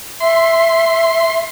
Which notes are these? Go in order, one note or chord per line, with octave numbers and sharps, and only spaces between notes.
E5 C6